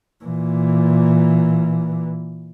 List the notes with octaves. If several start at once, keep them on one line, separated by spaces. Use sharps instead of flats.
A#2 E3